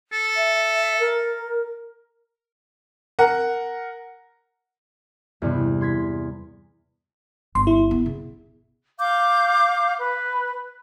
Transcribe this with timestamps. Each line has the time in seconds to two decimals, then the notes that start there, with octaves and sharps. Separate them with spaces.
0.12 A4
0.36 E5
0.99 A#4
3.19 A#4 F#5
5.42 E2 G2 C3
5.81 C6 G#6 B6
7.55 G1 C6
7.67 E4
7.91 B3
8.06 C#3
8.99 F5 D6 G6
9.98 B4